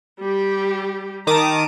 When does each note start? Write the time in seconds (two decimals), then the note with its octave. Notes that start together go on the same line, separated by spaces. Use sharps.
0.20 G3 G4
1.27 D#3 A5 A#5 D6 D#6